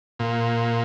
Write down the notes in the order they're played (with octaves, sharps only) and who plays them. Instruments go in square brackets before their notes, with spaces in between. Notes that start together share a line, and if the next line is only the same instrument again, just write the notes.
[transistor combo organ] A#2